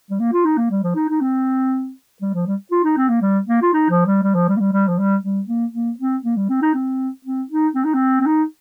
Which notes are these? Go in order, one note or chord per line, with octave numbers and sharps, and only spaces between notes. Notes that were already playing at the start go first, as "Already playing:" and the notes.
G3
A#3
F4
D#4
A#3
G3
F3
D#4
D#4
C4
G3
F3
G3
F4
D#4
C4
A#3
G3
A#3
F4
D#4
F3
G3
G3
F3
G3
A#3
G3
G3
F3
G3
G3
A#3
A#3
C4
A#3
G3
C4
D#4
C4
C4
D#4
C4
D#4
C4
C4
D#4